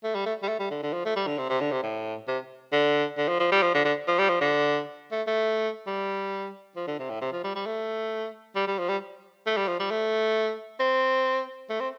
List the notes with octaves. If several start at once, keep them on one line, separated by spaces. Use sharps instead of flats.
A3
G3
A3
G3
A3
G3
D3
D3
F3
A3
G3
D3
C3
C3
D3
C3
A2
C3
D3
D3
F3
F3
G3
F3
D3
D3
F3
G3
F3
D3
A3
A3
G3
F3
D3
C3
A2
C3
F3
G3
G3
A3
G3
G3
F3
G3
A3
G3
F3
G3
A3
C4
A3
C4